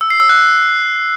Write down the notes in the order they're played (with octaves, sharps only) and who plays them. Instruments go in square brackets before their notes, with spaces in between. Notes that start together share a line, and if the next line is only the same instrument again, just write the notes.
[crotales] E6
C7
E6
F#6